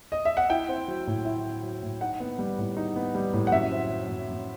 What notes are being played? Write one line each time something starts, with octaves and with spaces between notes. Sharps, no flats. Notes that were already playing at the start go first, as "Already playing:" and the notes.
D#5
E5
F#5
E4 G5
C4
F#3
A2
E4
C4
F#3
A2
D#4 F#5
B3
G3
A2
D#4
B3
G3
A2
F#5
F#2 E5
C4
F#3
F#2
F#2